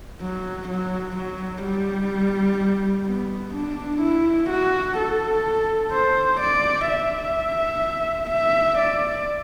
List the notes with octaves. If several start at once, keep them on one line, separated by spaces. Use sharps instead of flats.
F#3
F#3
F#3
G3
B3
D4
E4
F#4
A4
C5
D5
E5
E5
D5